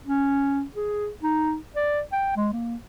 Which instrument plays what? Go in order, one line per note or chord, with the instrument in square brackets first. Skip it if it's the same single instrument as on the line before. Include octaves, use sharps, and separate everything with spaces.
[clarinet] C#4
G#4
D#4
D5
G5
G#3
A#3